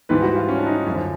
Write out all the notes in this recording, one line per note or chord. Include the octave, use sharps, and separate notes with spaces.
G#2 E3 G3 B4
F#4
F4
C#4
D4
D#4
F#2 D3 F3